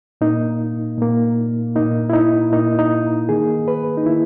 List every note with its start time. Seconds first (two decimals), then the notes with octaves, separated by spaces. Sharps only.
0.21 A#2 A#3 D#4
0.98 A#2 A#3
1.75 A#2 A#3 D#4
2.10 E4
2.13 D#4
2.52 A#2 A#3 D#4
2.79 D#4
3.29 D#3 A#3 G#4
3.68 B4
3.97 D#4
4.06 D#3 A#3 E4